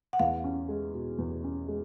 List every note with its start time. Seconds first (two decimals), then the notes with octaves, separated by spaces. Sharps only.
0.13 F#5
0.19 E2 F5
0.44 C#4
0.68 G#3
0.93 B2
1.18 E2
1.44 C#4
1.68 G#3